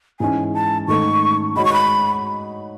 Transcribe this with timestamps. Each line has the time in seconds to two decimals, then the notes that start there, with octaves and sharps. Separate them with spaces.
0.20 G#2 E3 G#3 C#4 G#5
0.54 A5
0.88 G#2 D#3 A3 D#4 A4 C#6
1.56 G#3 D#4 F#4 C#5 B5
1.65 C#6
1.73 B5